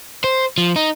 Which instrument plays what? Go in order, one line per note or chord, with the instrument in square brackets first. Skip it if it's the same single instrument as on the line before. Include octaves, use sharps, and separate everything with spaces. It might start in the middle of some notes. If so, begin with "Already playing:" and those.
[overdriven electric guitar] C5
F3
D#4